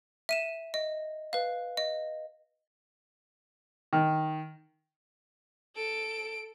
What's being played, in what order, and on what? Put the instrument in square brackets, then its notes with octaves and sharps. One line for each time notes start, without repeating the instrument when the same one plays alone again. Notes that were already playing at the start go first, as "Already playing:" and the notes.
[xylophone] E5 D#7 E7
D#5
B4 F5
D#5
[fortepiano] D#3
[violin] A4 D7